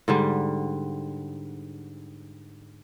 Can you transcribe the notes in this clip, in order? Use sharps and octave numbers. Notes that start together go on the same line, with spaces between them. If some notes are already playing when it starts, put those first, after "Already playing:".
G#2 D3 G3